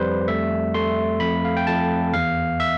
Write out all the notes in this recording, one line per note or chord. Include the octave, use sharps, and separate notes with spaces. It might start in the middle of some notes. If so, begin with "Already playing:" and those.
Already playing: F2 G3 B4 C5
A3 E5
A3 C6
F2 B5
F5
G5
F2 A5
E2 F5
E5